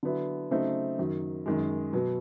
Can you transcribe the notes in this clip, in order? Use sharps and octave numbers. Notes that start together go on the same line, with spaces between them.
D3 F#3 B3 E4
C#3 F#3 A3 C4 D#4
F#2 D#3 F#3
F#2 D#3 G#3
B2 F#3 B3